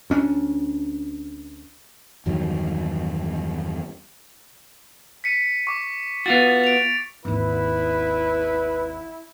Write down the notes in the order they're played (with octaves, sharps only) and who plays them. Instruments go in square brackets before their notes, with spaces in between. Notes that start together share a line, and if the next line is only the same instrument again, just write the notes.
[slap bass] D2 C#4 D4
[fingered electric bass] E2 G2 D#3 F#3
[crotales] B6 C#7 D#7
C#6 D6
[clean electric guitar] B3 F4 F#4 [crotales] A6
[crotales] D7 F7
[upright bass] G#1 D#2 [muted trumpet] E4 [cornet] B4